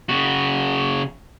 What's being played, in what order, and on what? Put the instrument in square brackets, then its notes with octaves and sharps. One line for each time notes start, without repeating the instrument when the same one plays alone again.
[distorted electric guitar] C#3 F#4